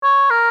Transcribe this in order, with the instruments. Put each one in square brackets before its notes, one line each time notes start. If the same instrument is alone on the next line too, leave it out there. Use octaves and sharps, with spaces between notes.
[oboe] C#5
A#4